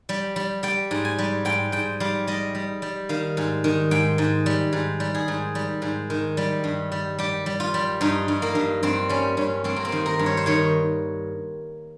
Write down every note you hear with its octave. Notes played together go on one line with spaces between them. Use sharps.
G3
G3
G3 G5
G#2
G#5
G3
G#2 G5
G#2 G5
G3 F5
G3 D#5
G3
G3
D#3 F5
G#2
D#3
G#2 G5
G#2
G3
G#2
G3
G#4
G#2
G3
G#2
D#3
G3
G2
G3
G3 G4
G3
F4
G3
G2 D#4
G2
A#3
G2
G2 C4
G3 C#4
G2 C#4
G2 C4
A#3
C4
D#3
A#4
G2
C#5
C5
D#3 C#5